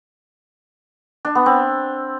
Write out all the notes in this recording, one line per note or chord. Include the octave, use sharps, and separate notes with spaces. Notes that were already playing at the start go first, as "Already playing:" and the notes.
D4
B3
C4